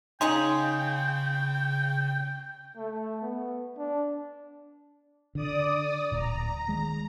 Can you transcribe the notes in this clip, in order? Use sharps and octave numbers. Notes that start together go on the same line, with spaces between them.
C#3 C#4 D#4 G#4 F5 G5 C6
A3
B3
D4
D3 D5 D#6
D1 A#2 A#5
D#3 G#3